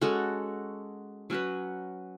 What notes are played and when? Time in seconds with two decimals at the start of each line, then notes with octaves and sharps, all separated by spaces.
0.01 G#3 C#4 F#4 A4
1.30 F#3 C#4 F#4 B4